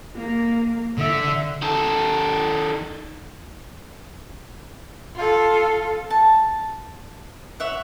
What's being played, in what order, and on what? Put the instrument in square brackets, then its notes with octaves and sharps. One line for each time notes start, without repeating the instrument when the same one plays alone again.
[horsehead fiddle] A#3
[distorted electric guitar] D3 [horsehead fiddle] E5
[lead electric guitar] D#3 A4
[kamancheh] F4 A4
[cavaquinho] A5
C#5 E5 F#5